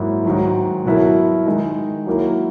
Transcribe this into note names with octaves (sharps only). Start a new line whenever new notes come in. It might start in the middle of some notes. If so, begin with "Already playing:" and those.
Already playing: G#2 F#3 A#3 E4
G#2 D#3 F#3
B2 F#3 B3 E4 A#4
D#3 G#3 D#4
F#3 A#3 E4 A#4